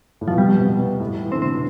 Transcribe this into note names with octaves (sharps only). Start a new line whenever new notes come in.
A2
B2 F3
C3 G3
B2
C3
B2
B2
A2
E3
D3 C4
C3 C4
B2